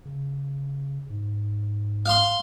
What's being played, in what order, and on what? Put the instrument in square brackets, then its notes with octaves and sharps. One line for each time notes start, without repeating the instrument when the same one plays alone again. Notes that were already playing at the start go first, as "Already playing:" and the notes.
[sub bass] C#3
G#2
[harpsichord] F5 C6